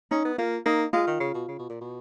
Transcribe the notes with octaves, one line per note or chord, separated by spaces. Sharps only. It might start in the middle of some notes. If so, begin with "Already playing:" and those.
C#4 D#4
B3
A#3 F4
A#3 D#4
G#3 F4
D#3
C#3
B2
C#3
B2
A#2
B2